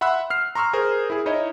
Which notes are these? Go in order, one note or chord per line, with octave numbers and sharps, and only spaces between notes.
E5 F#5 B5 C6 E6 F#6
F6 C7
A#5 C6 C#6 E6 F6
G#4 A#4 C5
E4 G#4
D#4 E4 C#5 D#5